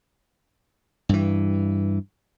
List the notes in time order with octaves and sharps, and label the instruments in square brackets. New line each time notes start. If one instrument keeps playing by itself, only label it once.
[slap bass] G2 E3